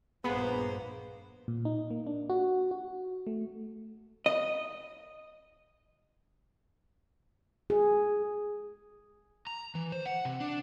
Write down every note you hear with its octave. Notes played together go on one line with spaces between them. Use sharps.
A#1 G2 A#3 B3 G#4 B4 C5
A#2
D#4
A#3
D4
F#4
F#4
A3
D#5
G#4
A#5
E3
C5
F#5
C3
D4